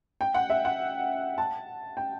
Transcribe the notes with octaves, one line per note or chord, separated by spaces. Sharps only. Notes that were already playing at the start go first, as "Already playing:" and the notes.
G5
F#5
E5
F#5
A5
G5